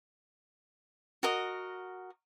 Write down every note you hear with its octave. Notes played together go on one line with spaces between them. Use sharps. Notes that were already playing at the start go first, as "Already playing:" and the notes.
F#4 A#4 D#5